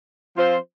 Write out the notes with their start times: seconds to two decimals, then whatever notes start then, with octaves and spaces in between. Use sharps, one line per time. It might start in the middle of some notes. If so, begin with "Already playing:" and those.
0.37 F3 C4 F4 C5